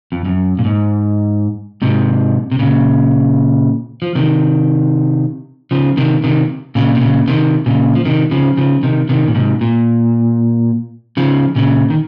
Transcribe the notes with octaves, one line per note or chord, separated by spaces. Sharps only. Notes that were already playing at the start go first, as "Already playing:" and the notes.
F2
F#2
A#2
G#2
G#2 C3
C3
A#2 C#3
F3
C3 D#3
C#3 F3
C3 D#3
C3 D#3
A#2 C#3
C3
A#2 C#3
C3 D#3
A#2 C#3
F3
C3 D#3
C#3 F3
C#3 F3
C3 D#3
C3 D#3
A#2
G#2 C3
A#2
C#3 F3
A#2 C#3
D#3